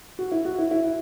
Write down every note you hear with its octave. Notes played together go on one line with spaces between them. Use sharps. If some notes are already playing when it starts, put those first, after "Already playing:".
F#4
E4
F#4
E4
E4